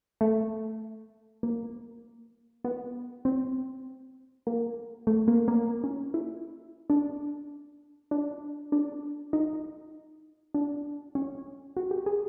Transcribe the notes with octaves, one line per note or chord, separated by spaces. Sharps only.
A3
A#3
B3
C4
A#3
A3
A#3
A#3
C#4
E4
D4
D4
D4
D#4
D4
C#4
F#4
G4
G#4